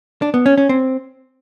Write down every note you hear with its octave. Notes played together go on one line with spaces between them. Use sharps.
D4
B3
C#4
C#4
C4